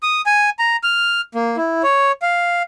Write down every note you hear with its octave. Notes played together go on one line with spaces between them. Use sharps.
D#6
G#5
A#5
F6
A#3
E4
C#5
F5